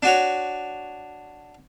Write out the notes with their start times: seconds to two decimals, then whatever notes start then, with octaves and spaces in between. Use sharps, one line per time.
0.03 D4 F#4 C#5